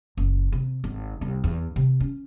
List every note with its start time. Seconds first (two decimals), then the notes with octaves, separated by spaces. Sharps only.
0.17 F#1
0.52 C3
0.84 G#1
1.21 C2
1.44 E2
1.76 C3
2.00 C#4